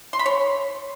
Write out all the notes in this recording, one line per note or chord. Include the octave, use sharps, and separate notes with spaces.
C6
B5
C#5